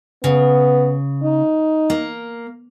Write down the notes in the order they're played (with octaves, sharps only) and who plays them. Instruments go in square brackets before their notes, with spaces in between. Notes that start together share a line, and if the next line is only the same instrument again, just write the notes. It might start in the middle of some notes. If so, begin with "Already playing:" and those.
[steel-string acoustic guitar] C#3 [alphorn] B3
[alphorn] D#4
[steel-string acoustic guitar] A#3